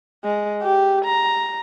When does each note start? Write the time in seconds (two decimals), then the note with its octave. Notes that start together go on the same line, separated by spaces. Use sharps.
0.24 G#3
0.62 G4
1.05 A#5